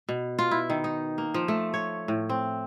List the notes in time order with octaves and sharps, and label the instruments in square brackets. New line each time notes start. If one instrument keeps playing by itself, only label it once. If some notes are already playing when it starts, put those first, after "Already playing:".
[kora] B2
F4
E4
D#3
D#4
A#3
F3
A3
C#5
A2
C4